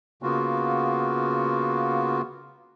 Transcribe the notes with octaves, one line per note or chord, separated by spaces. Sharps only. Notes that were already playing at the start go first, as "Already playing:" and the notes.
C#3 A#3 B3 F4 F#4